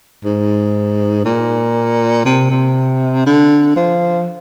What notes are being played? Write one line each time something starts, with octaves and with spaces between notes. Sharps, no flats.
G#2
A#2
C3
C3
D3
F3